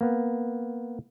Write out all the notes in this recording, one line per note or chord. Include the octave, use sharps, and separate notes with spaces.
A#3 B3